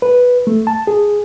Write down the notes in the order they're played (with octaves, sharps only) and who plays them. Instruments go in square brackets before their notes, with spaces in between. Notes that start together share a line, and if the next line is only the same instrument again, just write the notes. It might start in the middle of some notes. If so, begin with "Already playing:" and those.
[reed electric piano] B4
A3
A5
G#4